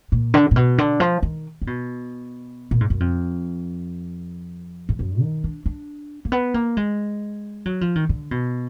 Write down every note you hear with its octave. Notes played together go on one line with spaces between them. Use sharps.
A#2
D3
A#2
B2
D3
F3
D#3
D3
B2
A#2
G#2
F#2
F2
G#2
F#2
D#3
D4
D4
A#3
B3
A#3
G#3
F#3
F3
D#3
D3
B2